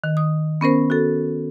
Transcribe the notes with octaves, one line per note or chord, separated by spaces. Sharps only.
D#3
D#6
B3 C#4 A#4 C5
F#4 A4